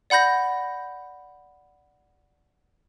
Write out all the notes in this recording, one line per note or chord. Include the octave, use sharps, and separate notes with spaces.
D5 F#5 B5 G6 A#6